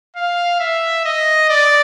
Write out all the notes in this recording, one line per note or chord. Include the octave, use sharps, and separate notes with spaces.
F5
E5
D#5
D5